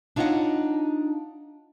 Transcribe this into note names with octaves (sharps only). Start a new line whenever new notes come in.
D4 D#4 F4 C#5 D#5 F#5